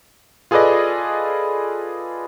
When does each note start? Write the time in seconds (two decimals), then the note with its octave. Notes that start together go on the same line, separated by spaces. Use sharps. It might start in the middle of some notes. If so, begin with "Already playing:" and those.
0.51 F4 G#4 A4 B4 D5 D#5